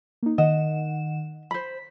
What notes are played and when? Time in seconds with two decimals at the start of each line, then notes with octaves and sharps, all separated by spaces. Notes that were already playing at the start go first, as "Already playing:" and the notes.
0.23 A#3 D#4
0.38 D#3 D#5 F#5 E7
1.51 C5 B5 B6